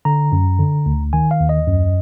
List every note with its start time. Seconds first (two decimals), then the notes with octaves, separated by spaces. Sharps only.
0.05 D3 A#5
0.32 F#2
0.59 D3
0.86 D2
1.13 D#3 G#5
1.31 F5
1.40 D#2
1.49 D#5
1.67 F#2